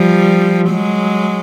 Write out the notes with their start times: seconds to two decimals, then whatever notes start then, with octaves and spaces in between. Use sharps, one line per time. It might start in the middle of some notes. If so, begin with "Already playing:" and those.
Already playing: F3 G3
0.69 F#3 G#3